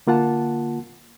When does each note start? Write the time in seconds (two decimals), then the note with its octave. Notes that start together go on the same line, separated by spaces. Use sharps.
0.07 D3 A#3 F4 F#5 A5